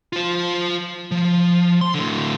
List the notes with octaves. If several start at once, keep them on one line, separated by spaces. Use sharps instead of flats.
F4 C5
F3
C6
A2 D3